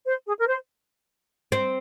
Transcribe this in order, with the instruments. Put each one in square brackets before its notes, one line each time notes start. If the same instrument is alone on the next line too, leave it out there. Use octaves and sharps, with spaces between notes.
[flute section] C5
G#4
A#4
C5
[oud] C4